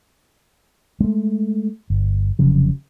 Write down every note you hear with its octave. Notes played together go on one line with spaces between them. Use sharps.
G#3 A3
G1
F1 F2 C#3 F#3